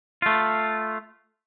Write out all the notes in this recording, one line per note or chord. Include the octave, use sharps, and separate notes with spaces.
A3 F4